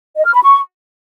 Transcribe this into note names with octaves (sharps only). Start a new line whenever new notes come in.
D#5
F6
B5
C#6